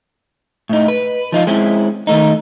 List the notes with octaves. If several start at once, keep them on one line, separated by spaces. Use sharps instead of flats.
A2 D#4
B4
F3 D#4 F4
G#3 C4 C#4 E4
D#3 A3 D#4